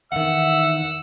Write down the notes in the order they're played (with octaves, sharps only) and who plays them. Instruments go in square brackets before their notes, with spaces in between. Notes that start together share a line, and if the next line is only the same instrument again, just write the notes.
[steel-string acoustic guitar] E2 D#3 [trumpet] E5 [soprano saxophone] F#5 [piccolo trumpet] E6